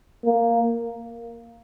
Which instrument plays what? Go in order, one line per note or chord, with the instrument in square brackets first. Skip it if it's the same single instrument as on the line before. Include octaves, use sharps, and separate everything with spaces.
[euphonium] A#3